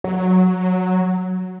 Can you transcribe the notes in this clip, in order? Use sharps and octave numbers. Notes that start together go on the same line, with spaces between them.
F#3